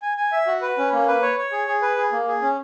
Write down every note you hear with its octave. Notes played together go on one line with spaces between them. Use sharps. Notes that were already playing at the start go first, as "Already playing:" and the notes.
G#5
G#5
E5
F#4
B4
C#4
A#3
B4
C#5
C#5
G#4
G#4
B4
G#4
A#3
G#4
C#4